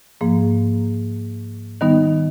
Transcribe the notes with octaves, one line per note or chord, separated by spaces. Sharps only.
G#2 F3 A#3
D#3 G3 B3 D#4